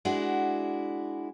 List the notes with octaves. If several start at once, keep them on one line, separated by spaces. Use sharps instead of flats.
G#3 D4 E4 F#4